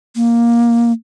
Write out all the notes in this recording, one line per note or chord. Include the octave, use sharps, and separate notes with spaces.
A#3